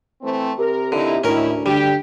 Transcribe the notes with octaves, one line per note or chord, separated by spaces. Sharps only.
E3 A3 C4
C3 A#4
A#2 D3 D#4 E4
D2 A2 D#3 C#4 E4 A#4
D3 G3 G4